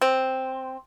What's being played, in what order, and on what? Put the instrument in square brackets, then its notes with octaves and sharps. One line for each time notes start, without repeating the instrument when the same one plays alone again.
[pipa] C4